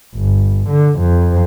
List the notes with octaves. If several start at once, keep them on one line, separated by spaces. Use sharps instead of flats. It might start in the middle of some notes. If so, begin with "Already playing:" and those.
G1
D3
F2